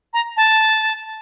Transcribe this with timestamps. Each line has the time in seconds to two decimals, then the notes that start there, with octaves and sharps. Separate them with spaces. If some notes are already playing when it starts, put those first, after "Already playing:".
0.14 A#5
0.37 A5